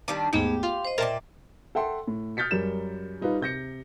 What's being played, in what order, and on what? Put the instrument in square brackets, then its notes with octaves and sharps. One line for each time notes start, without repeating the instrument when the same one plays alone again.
[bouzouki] D#3 G3 D4 [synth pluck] D6 D#7
[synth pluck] D#2 G#2 D#4 [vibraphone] A3 B3 G#4 [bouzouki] G4
[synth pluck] F4 [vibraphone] F5 C6
[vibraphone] C5 D#5
[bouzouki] A#2 D5 [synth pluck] A#4 A5 [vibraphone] E5 G5
[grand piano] A4 E5 F#5 G5 C6
A2
D#6 F6 G6 A6 B6 C#7
F#2 G3 A#4 E7
G3 D#4 F4 B4
C3 G6 A#6 C#7